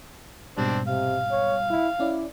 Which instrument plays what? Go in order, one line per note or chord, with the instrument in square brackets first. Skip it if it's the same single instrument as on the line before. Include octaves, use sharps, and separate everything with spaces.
[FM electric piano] G#2 B2 G3 [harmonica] C4 D4
[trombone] C3 [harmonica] F5
[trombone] C#5
E4
[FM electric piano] C#4 D5 [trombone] E4